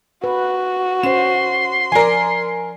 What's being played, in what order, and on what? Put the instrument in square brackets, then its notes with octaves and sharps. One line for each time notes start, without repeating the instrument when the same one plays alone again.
[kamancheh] F#4 [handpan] B4
[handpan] C#4 C5 [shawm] C6 [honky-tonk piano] E7
[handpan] F3 D5 [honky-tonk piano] A#4 G#5